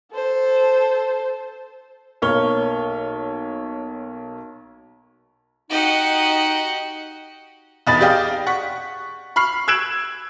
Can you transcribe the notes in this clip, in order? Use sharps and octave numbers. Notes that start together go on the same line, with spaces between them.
A4 C5
B1 A#3 C#5 C#6 F6 G7
D#4 F#4 G4 D#5 F#5
B1 E2 D#5 B5 A6
G4 G#4 D5 D#5 F5 G5
F#5 C#6 B6
B5 C#6 F6 C7
E6 F#6 G#6 D7 E7 F#7